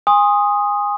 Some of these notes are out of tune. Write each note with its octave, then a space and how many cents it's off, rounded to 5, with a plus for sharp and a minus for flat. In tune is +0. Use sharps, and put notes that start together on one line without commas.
G#5 -25 C6 +20 D#6 +0